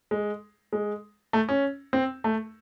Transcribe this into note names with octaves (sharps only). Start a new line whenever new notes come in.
G#3
G#3
A3
C#4
C4
A3